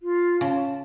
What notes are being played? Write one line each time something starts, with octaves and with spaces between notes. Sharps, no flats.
F4
C#3 A5